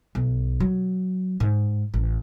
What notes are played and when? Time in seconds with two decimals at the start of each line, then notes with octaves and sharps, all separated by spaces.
0.15 B1
0.60 F#3
1.40 G#2
1.94 A1